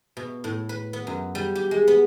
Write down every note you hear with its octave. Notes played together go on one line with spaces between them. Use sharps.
B2
A2
B4
B3
F#2
G3
G4
G#3
B3